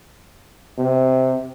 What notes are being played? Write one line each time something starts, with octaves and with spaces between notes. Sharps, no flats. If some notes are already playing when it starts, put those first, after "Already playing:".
C3